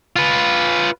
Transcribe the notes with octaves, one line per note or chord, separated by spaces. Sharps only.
F4 B4